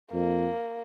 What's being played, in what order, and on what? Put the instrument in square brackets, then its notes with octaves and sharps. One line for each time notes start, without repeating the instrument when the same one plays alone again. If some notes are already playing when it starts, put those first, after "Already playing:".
[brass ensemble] F2 [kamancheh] A#3